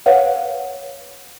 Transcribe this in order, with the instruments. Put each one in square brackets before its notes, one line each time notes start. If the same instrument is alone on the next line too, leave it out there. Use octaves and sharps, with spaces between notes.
[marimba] B4 C#5 F5 F#5